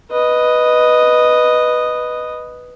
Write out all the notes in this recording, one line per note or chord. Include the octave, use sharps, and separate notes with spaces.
B4 D#5